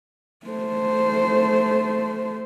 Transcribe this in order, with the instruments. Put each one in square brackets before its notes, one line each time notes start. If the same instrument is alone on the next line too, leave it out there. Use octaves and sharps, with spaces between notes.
[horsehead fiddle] A3 C5